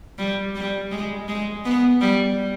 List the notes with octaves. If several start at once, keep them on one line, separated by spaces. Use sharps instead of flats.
G3
G3
G#3
G#3
B3
G3